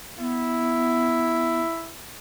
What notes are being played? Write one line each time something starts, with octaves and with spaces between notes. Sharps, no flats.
B3 E4